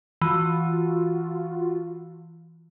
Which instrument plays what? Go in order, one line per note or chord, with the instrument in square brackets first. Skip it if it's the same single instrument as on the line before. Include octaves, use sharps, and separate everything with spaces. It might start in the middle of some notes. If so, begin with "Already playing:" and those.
[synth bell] E3 [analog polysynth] F4 F#4